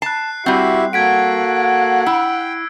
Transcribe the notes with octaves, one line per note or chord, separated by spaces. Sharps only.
A5 F#6 C7
G3 C4 E4 F#4 G4 E5
A#3 F#4 A4 F#5 G#6 B6 D7
E4 G5 E6